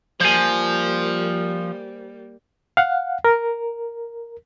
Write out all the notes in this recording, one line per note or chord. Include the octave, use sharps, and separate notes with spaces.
F3 G3 A#3 C5 G#5
F5 F#5
A#4